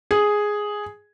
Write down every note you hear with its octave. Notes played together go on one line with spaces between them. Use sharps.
G#4